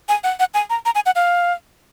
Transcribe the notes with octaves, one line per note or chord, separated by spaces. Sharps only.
G#5
F#5
F#5
G#5
A#5
A#5
G#5
F#5
F5